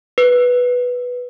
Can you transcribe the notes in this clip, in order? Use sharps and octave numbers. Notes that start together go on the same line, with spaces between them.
B4